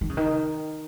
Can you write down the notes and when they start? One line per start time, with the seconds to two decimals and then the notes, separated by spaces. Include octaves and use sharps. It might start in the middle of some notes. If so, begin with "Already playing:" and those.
0.01 D#3
0.09 C#3
0.17 D#3